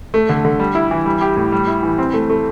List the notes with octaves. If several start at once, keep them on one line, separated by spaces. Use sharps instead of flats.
A3
D3
D3
G3
E4
E3
G3
G4
A2
G3
E4
E3
C4
A3
A3